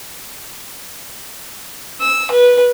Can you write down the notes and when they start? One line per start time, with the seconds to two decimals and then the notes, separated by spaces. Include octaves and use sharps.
2.01 E6
2.31 B4